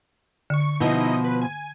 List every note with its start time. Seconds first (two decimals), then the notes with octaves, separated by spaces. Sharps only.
0.50 D3 C#6 C#7
0.80 B2 F3 D#4 E4 D#5
1.24 B4
1.41 G#5